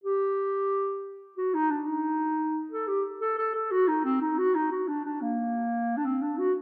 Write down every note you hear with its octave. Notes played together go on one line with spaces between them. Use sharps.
G4
F#4
D#4
D4
D#4
A4
G4
A4
A4
A4
F#4
D#4
C4
D#4
F#4
D#4
F#4
D4
D4
A#3
D4
C4
D4
F#4